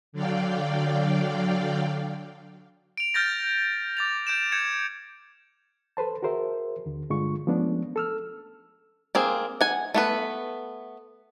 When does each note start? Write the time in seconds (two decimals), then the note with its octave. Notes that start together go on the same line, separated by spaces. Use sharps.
0.12 D3 F#3 D5 F5 G5
2.97 D7 F7
3.14 F6 G6 A6 A#6
3.97 D6 A6 F7
4.27 G6 D7 E7
4.52 G6 G#6 C#7 E7
5.97 A4 B4 C5 A5
6.23 F#4 G#4 A#4 C5 E5
6.86 D#2 D3
7.10 G2 D3 G#3 F4 C#6
7.47 F3 G#3 A3 B3 C#4 D4
7.96 A4 E6 F6
9.15 A#3 C4 G#4
9.61 F#5 G#5
9.94 A3 B3 B4